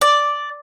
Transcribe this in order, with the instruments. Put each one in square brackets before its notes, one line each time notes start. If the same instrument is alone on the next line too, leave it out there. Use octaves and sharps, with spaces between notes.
[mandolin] D5